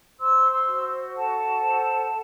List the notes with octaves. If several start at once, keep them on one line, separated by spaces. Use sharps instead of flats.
C5 C6 E6
C6 E6
F#4
A4 F#5 A5
C5